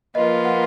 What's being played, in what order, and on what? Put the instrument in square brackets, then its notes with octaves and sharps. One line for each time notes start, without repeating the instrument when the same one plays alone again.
[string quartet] F3 A#3 F4 B4 [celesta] D#5
[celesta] F#5